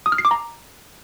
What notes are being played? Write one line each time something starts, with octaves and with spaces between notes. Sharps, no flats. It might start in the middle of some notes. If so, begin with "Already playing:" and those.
D#6
F6
C7
D6
A#5